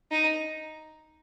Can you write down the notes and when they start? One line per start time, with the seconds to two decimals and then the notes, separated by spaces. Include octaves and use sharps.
0.11 D#4